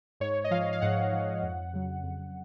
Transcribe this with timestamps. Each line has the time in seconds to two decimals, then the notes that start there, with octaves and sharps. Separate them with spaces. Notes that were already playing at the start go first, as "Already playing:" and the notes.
0.20 G#2 C#5
0.44 D#5
0.51 F3 F5
0.73 F5
0.81 G#2 F#5
1.12 F3
1.42 F2
1.73 C#3 F#3
2.03 F2